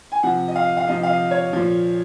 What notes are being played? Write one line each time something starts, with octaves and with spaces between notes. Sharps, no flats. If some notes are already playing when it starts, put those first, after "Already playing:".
G#5
C3 F3 F#5
D#5
F5
F5
C3 F3 D#5
F5
D#5
C#5
A#2 F3